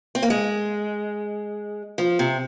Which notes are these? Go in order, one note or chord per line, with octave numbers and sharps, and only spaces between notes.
C4
A#3
G#3
F3
C3